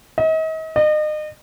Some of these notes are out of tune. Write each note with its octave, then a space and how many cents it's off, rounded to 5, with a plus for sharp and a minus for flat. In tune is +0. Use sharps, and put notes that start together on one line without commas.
D#5 +40
D#5 -35